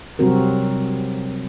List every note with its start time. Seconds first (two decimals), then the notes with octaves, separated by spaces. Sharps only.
0.19 C3 F#3 G3 C4 F#4 A#4